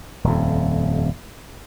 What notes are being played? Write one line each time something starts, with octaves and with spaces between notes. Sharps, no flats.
D#1 F2